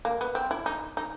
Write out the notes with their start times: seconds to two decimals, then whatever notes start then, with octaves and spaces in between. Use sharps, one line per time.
0.05 A#3
0.21 B3
0.35 C4
0.51 E4
0.66 D#4
0.97 D#4